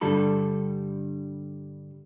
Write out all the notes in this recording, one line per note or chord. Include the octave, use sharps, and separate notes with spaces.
G2 D3 G3 A4 B5